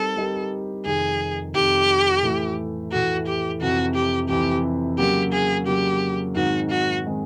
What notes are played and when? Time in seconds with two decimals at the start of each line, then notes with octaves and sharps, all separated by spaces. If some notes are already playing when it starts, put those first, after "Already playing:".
Already playing: G3 C4 D#4 G4 A4 A#4
0.16 G3 C4 D#4 G4 A#4
0.85 F2 C3 D#3 G#4
1.54 F2 C3 D#3 G4
2.23 A2 E3 A3
2.92 A2 E3 A3 F#4
3.27 G4
3.61 F2 C3 E3 F#4
3.95 G4
4.29 F2 C3 E3 G4
4.98 C#3 F#3 A#3 G4
5.33 G#4
5.67 C#3 F#3 A#3 G4
6.36 G#2 D#3 G#3 C4 F#4
6.70 F#4
7.06 D#3 G#3 C4